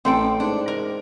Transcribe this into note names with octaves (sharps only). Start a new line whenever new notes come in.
A1 C4 A4 G5
G#2 D4
A#4